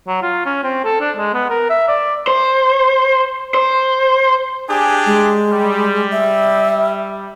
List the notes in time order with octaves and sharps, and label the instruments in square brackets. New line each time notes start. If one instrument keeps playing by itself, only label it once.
[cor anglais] F#3
F4
C#4
C4
A4
D4
G#3
B3
A#4
E5
D5
[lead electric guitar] C5
C5
[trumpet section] D4 G4 G#4 [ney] G#5
[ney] G#3
[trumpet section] G3
[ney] E5